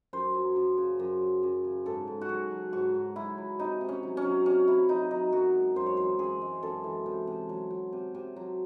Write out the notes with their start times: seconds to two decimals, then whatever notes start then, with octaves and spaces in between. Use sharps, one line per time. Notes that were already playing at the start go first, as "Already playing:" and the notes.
0.13 F#2 C5
0.34 F#3
0.56 F#2
0.78 C#3
0.99 F#2
1.21 F#3
1.43 F#2
1.65 C#3
1.86 G#2 A4
2.08 G#2
2.21 F#4
2.29 F#3 G#4
2.51 F#3
2.73 G#2 F#4
2.94 G#2
3.16 F#3 E4
3.38 F#3
3.59 C3 D#4
3.81 C3
3.89 C#4
4.03 F#3
4.17 C#4
4.25 F#3
4.46 C3 C#4
4.67 C3 E4
4.89 F#3 D#4
5.11 F#3 D#4
5.32 F#2 F#4
5.54 G#3
5.76 F#2 C5
5.86 C#5
5.97 E3 C5
6.19 F#2 G#4
6.42 G#3
6.62 F#2 A4
6.84 E3
7.06 C3
7.27 C3
7.49 F#3
7.71 F#3
7.93 C3
8.15 C3
8.36 F#3